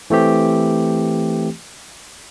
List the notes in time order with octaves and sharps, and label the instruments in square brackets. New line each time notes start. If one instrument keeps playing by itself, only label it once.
[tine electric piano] E3 A3 C4 G4